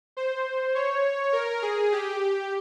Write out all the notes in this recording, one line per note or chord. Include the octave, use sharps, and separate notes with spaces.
C5
C#5
A#4
G#4
G4